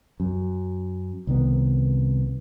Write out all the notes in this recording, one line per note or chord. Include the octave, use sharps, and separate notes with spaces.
F#2
C2 D#3 B3